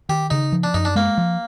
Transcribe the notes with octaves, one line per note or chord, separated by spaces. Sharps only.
D#3 G4
C#3 D#4
F3
D4
F#2 D#4
D4
G#3 A#3
F3